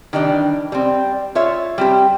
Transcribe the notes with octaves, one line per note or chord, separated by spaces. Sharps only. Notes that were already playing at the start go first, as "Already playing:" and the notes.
D#3 E3 G3 D4
G3 C4
F4 C#5 E5
G3 C4 G4